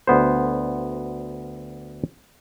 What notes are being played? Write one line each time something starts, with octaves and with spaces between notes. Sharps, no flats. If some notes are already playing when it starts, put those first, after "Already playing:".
D2 B3 C5